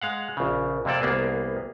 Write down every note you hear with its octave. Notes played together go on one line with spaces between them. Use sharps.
G#3 F5 F#5
A#1 C#3
F2 C3 A#3 C4 A4 D5
C2 A#3 B3 G#4